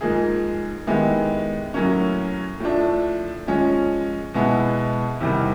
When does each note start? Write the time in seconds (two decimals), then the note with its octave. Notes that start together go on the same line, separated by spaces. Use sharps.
0.01 G#2 F3 A#3 D#4 G#4
0.87 D#3 G#3 B3 E4 G4
1.74 A2 F#3 A#3 C#4
2.60 A2 F3 A3 D4
3.47 F3 G#3 C#4
4.34 B2 G#3 B3 E4
5.21 E2 C3 D#3 G3